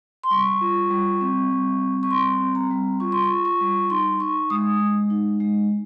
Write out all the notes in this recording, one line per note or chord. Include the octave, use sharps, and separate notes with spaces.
C6
G3 C#6
F4
G3
C4
G3
C4
C#6
G3 C6
C4
A#5
G3
F4 C#6
C6
C#6
F4
C#6
G3
D#4 C6
D#4 C#6
G#3 D#6
G#3
D#4
G#3